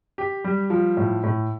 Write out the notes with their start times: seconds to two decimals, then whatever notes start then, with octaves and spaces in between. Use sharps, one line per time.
0.18 G4
0.44 G3
0.70 F3
0.97 A2
1.23 A2